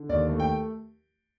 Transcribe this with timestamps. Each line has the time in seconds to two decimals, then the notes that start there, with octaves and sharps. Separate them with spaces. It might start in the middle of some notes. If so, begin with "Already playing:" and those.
Already playing: D3
0.09 D#2 D5
0.29 A3
0.40 G5